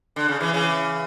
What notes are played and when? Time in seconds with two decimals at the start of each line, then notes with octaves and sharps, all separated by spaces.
0.16 D3
0.28 C#3
0.41 C#3 E3
0.54 C#3 E3